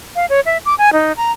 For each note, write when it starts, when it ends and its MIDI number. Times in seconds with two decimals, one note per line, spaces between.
0.16 0.26 77
0.30 0.40 73
0.46 0.58 76
0.65 0.75 86
0.78 0.90 80
0.93 1.13 63
1.17 1.32 82